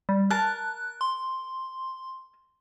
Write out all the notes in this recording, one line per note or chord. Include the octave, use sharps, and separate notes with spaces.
G3
A#4 A5 F#6
C6